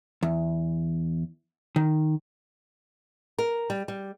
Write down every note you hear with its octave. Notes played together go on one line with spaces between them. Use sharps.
E2
D#3
A#4
G3
G3